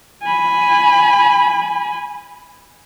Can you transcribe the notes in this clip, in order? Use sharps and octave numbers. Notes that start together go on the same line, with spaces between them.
G#5 B5